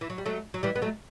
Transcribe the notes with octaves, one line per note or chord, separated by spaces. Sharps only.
E3
F#3
G3
F#3 A3
F#3
E3 G3
B3
F#3 A3